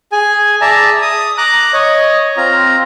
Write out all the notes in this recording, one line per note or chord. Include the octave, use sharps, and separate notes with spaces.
G#4 G#5
G#4 D5 E5 A5 A#5
D#6
A#5 D6 F#6
C#5 D#5
C4 F4 A#5